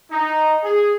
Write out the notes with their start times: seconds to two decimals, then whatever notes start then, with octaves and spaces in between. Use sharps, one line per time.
0.10 D#4
0.64 G#4